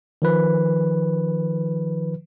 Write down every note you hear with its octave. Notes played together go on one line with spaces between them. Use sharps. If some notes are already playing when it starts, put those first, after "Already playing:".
D#3 F3 B4